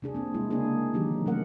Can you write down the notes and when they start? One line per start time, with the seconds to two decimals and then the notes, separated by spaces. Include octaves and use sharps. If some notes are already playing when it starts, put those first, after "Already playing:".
0.02 C3 D4 G#4
0.15 A#3 C4
0.34 G#3 E4
0.51 C#3 A#3 D4 E4 G#4
0.94 D#3 E3 F#3 D#4 G4
1.26 C3 F#3 A3 C#4 A#4 F#5